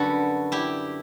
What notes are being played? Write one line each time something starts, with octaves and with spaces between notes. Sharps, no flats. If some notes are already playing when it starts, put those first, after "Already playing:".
Already playing: F#2 D3 G3 F#4 A4 B4
E4 G4